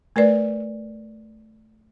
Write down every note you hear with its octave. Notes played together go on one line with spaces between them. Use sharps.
A3 A#4 B4 D5